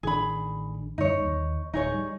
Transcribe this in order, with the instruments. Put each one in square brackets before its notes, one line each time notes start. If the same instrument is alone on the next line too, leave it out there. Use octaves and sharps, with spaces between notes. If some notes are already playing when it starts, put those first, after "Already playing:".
[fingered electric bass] A1 D#3 D4 [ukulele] G#4 B5
[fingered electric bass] F#2 D3 G3 [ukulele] D#4 C#5
[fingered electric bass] D#2 D#3
[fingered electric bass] D1 [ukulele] D#4 G#4 C#5
[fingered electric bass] G3